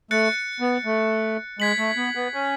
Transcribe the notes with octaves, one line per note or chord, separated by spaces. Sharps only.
A3 F#6 A6 C#7
B3
A3
G#3 G#6 B6 F#7
A3
B3
B3
C#4